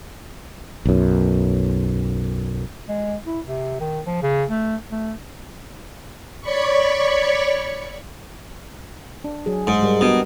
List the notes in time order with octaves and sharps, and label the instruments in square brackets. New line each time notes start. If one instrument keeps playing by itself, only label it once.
[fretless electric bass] B1 F#2
[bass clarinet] G#3
E4
C3
D#3
F3
C#3
A3
A3
[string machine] C#5 D5 B5 C#6
[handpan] D4
F#3 G#4
[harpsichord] G#2
[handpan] G3 G#3 A#4
[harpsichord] B2 [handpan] D4 G4 A#4